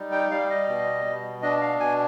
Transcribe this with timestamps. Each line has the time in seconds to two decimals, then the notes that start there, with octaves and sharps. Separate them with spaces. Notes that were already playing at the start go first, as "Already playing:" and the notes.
Already playing: G3 D#4
0.12 G5
0.31 G3 F5
0.50 D#5
0.68 B2
1.05 B2
1.42 D4 D#5
1.61 F5
1.80 B2 G#5